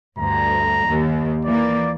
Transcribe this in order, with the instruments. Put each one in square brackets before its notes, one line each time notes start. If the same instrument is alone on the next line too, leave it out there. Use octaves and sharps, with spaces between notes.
[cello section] D2 G2 [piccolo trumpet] A#5
[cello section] D#2
[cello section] E3 A#3 [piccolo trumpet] D5